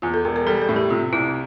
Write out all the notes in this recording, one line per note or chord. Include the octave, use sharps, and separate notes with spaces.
E2 F4
A4
E1 A#4
A#4
G3 A4
A4
A2
G4
C3 F4
C2 E4